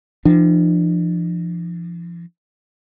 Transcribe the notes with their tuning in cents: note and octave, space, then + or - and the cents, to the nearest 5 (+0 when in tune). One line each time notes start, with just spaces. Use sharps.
F3 -35 D4 +40